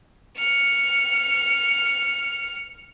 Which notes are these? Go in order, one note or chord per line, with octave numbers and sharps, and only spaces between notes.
F6 C#7